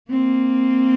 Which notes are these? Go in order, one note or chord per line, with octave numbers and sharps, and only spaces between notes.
A#3 C4